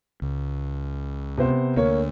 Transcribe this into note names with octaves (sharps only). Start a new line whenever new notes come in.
C#2
C3 B3 C5
D2 A#3 C#5